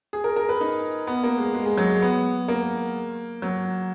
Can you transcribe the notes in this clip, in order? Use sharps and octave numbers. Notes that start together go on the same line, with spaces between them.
G#4
A#4
A#4
B4
D#4
B3
A#3
G#3
G#3
G#3
F#3
G#3
B3
A#3
F#3